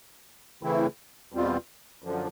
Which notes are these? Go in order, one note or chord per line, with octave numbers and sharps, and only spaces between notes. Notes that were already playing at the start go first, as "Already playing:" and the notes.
C#3 E3 A3 C4 E4
E2 B2 G3 C4 F4
F#2 D3 F3